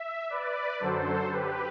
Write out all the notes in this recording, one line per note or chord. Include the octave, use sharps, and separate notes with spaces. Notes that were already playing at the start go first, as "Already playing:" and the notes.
Already playing: E5
B4 D5
F#2 D3 F#3 A4 C5
G4 B4